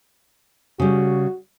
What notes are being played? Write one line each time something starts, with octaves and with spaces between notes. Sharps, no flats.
C#3 G3 F#4